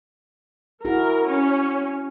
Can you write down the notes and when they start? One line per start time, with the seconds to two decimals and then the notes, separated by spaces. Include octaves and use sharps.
0.85 E4 F#4 G#4 A#4
1.29 C#4